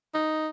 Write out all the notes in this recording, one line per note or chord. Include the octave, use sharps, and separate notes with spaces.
D#4